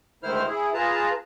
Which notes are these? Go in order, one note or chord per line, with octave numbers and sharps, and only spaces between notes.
D2 G#2 D#3 E4 C5 F6
E4 G#4
F4 G#4 B4 A5 A#5